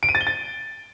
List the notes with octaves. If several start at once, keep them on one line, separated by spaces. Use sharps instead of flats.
D7
D#7
A6
G7
A6